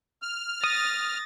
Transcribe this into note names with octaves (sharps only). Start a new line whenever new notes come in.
F6
D#6 A6 A#6